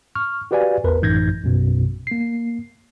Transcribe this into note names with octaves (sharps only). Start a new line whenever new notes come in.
C#6 F6
F#4 G4 B4 D5 F5 G#5
A1 E2 A#4 B4
A1 F#2 D#4 G6 G#6 A#6
A#1 F#2 B2
A#3 C7